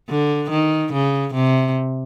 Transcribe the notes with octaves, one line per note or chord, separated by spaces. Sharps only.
D3
D#3
C#3
C3